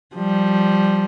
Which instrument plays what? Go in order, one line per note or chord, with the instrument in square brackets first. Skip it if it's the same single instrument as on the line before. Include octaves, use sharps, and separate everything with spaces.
[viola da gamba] F3 G3